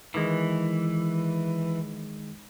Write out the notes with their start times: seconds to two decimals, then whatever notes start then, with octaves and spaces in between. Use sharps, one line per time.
0.14 D#3 E3 G#3